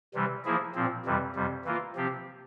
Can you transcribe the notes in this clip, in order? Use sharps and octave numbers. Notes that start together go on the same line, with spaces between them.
C3 E3 G3
F3 A#3 E4 G#4
A#2 F3 C4
F2 C3 E3 G3
F2 C3 G3
E3 A#3 F4
C3 F3 C4 G4